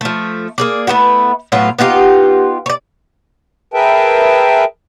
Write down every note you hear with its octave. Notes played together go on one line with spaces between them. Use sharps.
F3 A3
A#3 G#4 D5
A3 B3 E4 F#4
A2 F#3 B3 F4
B3 D#4 F4 G4
C#5 D5
G#4 A#4 B4 E5 G5 A5